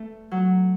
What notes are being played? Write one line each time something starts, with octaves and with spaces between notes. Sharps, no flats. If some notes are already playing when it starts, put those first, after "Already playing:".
Already playing: A3 A4
F#3